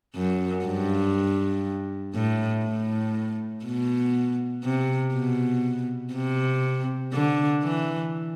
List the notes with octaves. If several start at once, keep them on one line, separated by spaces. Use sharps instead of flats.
F#2
G2
A2
A2
B2
C3
B2
C3
D3
E3